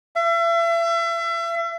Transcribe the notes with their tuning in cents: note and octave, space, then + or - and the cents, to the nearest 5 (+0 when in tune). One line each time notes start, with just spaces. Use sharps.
E5 +35